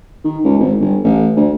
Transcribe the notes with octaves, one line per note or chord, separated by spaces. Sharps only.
D#3
C#2
G#1
G1
A1
D2